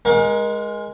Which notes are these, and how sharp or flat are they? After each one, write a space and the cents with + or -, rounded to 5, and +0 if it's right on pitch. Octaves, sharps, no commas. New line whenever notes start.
G#3 +0 A#4 +30 F5 +45